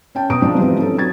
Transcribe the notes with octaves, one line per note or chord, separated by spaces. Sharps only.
C#4 G5 A5
B2 B4 A#5 D#6 D7
G#2 F3 C4 D4 D#4
E3 F3 G3 B3 C4
C#4 D#4 A4
F#3 G#6 A6